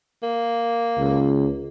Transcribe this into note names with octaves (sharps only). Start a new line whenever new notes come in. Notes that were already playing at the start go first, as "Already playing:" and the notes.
A#3
C#2